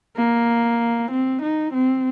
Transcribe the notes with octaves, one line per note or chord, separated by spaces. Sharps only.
A#3
C4
D#4
C4